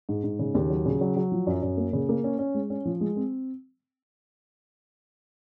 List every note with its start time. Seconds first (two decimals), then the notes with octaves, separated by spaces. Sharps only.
0.09 G#2
0.24 G#2
0.39 C#3
0.55 D#2
0.70 F#3
0.86 C#3
1.01 F#3
1.17 F#3
1.32 F3
1.47 F#2
1.62 F#2
1.77 A#3
1.93 C#3
2.09 A#3
2.24 C#4
2.39 C#4
2.55 G#3
2.70 C#4
2.85 F3
3.01 G#3
3.16 C4